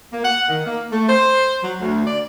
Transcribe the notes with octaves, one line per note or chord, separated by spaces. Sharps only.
A#3
F#5
D#3
A#3
A3
C5
F#3
D2
D5